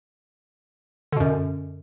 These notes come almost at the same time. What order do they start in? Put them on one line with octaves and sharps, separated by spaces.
D3 B2 F#2